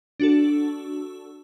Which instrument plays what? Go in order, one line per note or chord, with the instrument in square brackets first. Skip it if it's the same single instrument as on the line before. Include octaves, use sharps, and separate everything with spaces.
[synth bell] D4 F#4 A4